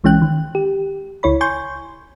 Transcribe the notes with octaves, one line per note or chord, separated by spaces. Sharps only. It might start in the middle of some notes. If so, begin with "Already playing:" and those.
C2 E3 G#3 C#4 G5 F#6
D#3
G4
C#2 E4 C#5 B5
G#5 C6 C#6 G6